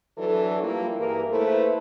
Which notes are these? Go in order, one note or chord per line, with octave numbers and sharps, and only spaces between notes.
E3 F#3 D4 A4
G3 A#3 E4 F4
G2 E3 A#3 G#4 A#4
A3 A#3 E4 A4 B4 C5